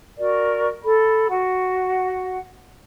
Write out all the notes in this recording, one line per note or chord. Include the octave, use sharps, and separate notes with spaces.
F#4 A#4 D5
A4 B5
F#4 F#5